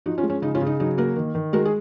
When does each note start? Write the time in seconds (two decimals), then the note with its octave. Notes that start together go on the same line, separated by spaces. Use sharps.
0.06 F3 D#4 F#4
0.18 C#4 F4
0.23 G#3
0.30 C#4
0.42 C#3 D#4
0.55 C#4 F4
0.61 C#3
0.66 D#4
0.80 F#3 D#4
0.98 A#3 F#4 A#4
1.16 D#3
1.35 D#3
1.53 G#3 F#4 A#4
1.65 G#4